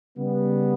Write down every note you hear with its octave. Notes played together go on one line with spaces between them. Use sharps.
C#3 G3 B3